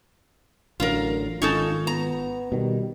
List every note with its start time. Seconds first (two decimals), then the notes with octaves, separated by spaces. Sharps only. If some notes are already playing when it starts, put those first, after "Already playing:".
0.80 A1 D3 F#3 F4 A#4
1.42 G#1 C#4 D#4 F4 A4
1.87 B3 A#5
2.52 B2 D#3 G3